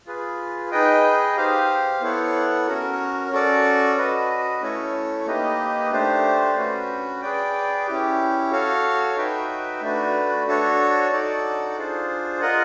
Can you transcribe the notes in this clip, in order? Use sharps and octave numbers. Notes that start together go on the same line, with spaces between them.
F4 G#4 B4
D#4 G#4 B4 D#5 G5
G4 C5 F5
B3 E4 A4 C#5 F#5
C#4 F#4 A#4
C#4 F#4 A4 D5
F#4 B4 D#5
A3 C#4 E4 A4 C#5
A#3 D#4 G4 B4 D#5
A3 D4 G4 C5
C#4 F#4 B4
G#4 B4 D5 G5
C#4 E4 G4
F#4 A4 C#5 F5
D#4 F#4 B4 E5 G5
A3 D4 F#4 B4
D4 F#4 A4 C#5
D#4 F#4 A4 D5 F#5
D4 F4 G#4 C5
F4 A#4 D#5 F#5